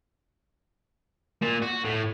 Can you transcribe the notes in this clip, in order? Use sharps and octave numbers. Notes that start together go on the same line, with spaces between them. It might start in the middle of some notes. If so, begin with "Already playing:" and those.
A#2
F#4
A2